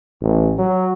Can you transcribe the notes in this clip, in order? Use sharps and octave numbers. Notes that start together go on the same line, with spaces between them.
A1
F#3